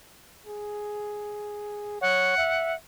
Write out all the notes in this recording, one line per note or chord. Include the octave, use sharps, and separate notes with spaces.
G#4
C#5 F#5
E5